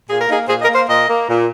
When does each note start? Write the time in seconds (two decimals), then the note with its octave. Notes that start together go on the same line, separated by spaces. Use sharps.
0.09 A#2 G#4
0.20 A#4
0.29 A#3 D#4 G#4
0.48 A#2 G#4 C5
0.62 A#4 D#5
0.68 A#3
0.75 C5 F5
0.88 A#2 A#4 D#5
1.08 A#3
1.27 A#2